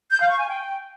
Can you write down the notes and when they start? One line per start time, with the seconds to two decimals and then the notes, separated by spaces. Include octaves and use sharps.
0.12 G6
0.21 F5
0.30 C#6
0.39 G#5
0.49 G5